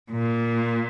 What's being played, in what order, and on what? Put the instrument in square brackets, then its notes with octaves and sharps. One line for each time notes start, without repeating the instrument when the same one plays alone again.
[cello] A#2